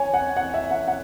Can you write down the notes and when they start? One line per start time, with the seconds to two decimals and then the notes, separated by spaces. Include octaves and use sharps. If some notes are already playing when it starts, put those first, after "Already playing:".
Already playing: C#5 G#5
0.14 F#5
0.37 F#5
0.54 E5
0.71 F#5
0.88 F#5